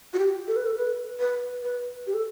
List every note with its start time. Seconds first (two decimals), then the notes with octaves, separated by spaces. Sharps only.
0.14 F#4
0.19 G4
0.48 A4
0.56 B4
0.66 A4
0.77 B4
1.20 B4
1.63 B4
2.07 G4
2.14 A4